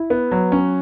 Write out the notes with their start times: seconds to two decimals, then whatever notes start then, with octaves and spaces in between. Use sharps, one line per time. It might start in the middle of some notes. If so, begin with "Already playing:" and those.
Already playing: E4
0.10 B3
0.31 F#3
0.52 C#4